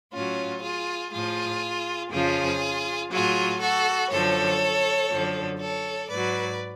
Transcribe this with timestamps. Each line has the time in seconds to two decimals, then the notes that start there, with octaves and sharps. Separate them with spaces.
0.11 A2 F#3 C#4 F4
0.62 F4 G#4
1.11 A2 F3 F4 G#4
2.10 F2 C#3 F3 F4 G#4
3.10 A2 F#3 F4 G#4
3.60 F#4 A4
4.09 F#2 D3 F3 A4 C#5
5.10 F#2 D3 F3
5.59 A4 C#5
6.09 G#2 F#3 B4 D5